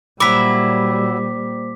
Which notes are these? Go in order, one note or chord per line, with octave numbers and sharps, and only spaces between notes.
A#2 F#3 G3 A#3 E4 C5 D6 B6